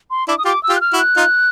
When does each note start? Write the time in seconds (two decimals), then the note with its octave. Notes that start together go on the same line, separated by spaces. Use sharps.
0.11 C6
0.28 D4 E4 D6
0.38 D#6
0.45 F4 G4 D6
0.63 E6
0.69 F4 G4
0.76 F#6
0.81 F6
0.93 E4 F#4
0.99 F#6
1.17 D#4 F4